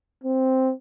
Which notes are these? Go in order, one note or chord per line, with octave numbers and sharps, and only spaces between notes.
C4